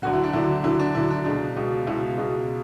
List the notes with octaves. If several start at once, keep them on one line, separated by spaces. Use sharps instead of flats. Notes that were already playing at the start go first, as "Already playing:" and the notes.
D2 D3 F#3 F#4
E4
D4
D2 D3 F#3 E4
D2 D3 F#3 E4
D4
D2 D3 F#3 E4
D4
C#2 B2 G#3 D4
C#2 B2 G#3
C#2 B2 G#3 E4
C#2 B2 G#3